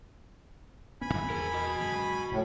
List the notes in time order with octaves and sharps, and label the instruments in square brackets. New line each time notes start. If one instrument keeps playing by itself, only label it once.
[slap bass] D1 B3 C#4 [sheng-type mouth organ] G#5 B5
[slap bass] E2 G2
[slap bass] E2 [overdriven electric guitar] G#4 A#4
[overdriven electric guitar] F#4 D#5
[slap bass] F#2 D3 G#3
[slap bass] F1 F2 C#3 [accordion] A2